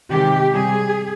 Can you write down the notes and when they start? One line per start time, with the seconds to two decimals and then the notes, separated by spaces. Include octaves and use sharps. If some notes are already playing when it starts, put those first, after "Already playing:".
0.10 C3 D#3 G#3 G4
0.53 C3 G3 G#4